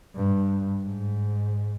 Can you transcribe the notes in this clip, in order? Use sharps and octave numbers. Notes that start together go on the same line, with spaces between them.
G2
G#2